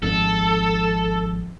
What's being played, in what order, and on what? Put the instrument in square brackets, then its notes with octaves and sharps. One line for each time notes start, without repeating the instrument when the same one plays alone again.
[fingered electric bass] G#1 F2 G#2 [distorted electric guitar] A4